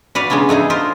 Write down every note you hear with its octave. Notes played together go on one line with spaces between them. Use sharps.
F#4 B4 D5 F5
C#3 G#3 B3 C#4 D4
A3 D4 D#4 G#4
F4 A#4 C5